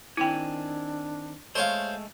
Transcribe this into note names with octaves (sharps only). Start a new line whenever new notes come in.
D#3 C4 D4 E4 G5 G#5
G#3 A3 C5 C#5 F5